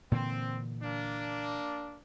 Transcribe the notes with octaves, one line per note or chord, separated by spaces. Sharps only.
A#2 D3 E3 C4
A#3 D4